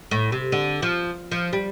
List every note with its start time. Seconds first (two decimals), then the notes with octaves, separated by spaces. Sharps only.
0.11 A2
0.32 C3
0.52 D3
0.82 F3
1.31 F3
1.53 G3